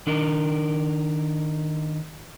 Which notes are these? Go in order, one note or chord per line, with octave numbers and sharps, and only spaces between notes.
D#3 D4 D#4 A#4 D#5